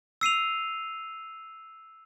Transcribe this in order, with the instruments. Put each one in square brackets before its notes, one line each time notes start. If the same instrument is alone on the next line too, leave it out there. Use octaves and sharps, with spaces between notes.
[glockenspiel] E6 C7 D#7 F7